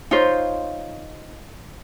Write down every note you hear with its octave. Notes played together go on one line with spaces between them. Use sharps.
D#4 F4 C5 C#5